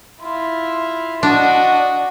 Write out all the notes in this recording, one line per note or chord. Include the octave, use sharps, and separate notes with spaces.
E4 F4
D4 F#4 D#5